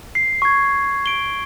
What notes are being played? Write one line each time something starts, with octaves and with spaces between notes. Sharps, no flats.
C7
C#6 G#6
D7 G7